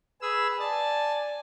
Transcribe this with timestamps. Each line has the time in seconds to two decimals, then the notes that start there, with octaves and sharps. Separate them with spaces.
0.22 G#4 B4 E6
0.60 D5 G#5 A5